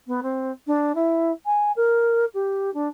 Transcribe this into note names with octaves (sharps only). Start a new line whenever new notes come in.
B3
C4
D4
E4
G#5
A#4
G4
D4